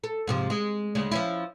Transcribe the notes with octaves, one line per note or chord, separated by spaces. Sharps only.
A4
G#2 C3 F3
G#3
D2 C#3 G#3
F3 C#4 E4